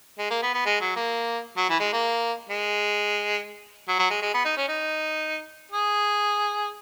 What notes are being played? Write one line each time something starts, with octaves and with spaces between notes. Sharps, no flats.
G#3
A#3
B3
B3
G#3
F#3
A#3
F#3
E3
G#3
A#3
G#3
F#3
F#3
G#3
G#3
B3
D#4
C#4
D#4
G#4